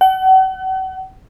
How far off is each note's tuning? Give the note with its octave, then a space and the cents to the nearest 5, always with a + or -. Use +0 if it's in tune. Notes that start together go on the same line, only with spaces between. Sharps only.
F#5 +40